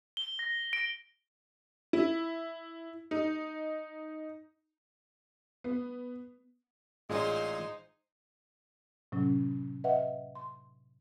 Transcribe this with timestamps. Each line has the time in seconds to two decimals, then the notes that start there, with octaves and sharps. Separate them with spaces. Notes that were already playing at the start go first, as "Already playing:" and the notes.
0.17 G7
0.39 A#6
0.73 D7
1.93 E4
3.11 D#4
5.64 B3
7.10 A1 A#2 G#3 D#4 F4 C5 C#5
9.12 A2 C3 F#3 C#4
9.84 B4 D#5 E5 F#5
10.35 C6